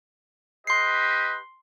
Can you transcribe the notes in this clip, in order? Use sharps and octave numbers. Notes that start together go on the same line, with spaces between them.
G4 B4 D#5 C6 C7